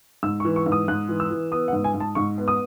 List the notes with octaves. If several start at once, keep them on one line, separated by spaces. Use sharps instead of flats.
G#2 E6
C#6
E3
C#6
G#2
D#6
G#2 F#6
E3
E6
E3
B3 D#6
F#5
G#2
G#5
G#2
A5
G#2 C#6
B3
D#6